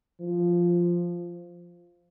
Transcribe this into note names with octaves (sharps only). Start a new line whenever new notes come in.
F3